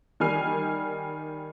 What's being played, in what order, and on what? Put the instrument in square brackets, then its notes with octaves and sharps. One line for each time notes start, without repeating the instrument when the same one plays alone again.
[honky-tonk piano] D#3 G3 G#5 F6 C7